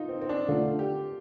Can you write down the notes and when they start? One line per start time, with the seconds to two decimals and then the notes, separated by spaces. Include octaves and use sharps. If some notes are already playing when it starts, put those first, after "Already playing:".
Already playing: D#4 F4
0.09 C4
0.22 C4
0.29 D4
0.48 D3 A3 D4 F4
0.79 G4